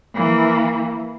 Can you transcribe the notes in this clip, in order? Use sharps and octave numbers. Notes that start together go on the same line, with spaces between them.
E3 A#3